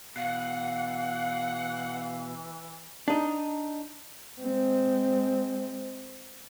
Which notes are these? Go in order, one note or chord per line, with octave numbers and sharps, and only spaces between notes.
B2 E3 F5 F#5
D4 D#4
G#3 C4